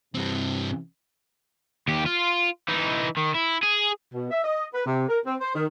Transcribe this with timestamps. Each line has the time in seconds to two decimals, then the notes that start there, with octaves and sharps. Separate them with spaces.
0.15 G2 C3 E3 C4
1.88 D#2 G4
2.06 F4
2.69 E3 D#4
3.17 D#3
3.35 E4
3.63 G#4
4.14 B2
4.31 E5
4.44 D#5
4.74 B4
4.86 C3
5.08 A#4
5.26 C4
5.41 C5
5.55 D#3